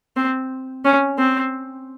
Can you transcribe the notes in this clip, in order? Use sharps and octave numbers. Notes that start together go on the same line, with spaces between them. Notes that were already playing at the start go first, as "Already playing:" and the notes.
C4
C#4
C4